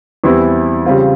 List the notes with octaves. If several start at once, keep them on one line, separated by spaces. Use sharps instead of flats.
E2 E3 G3 C4 E4
C#3 G3 C4 F4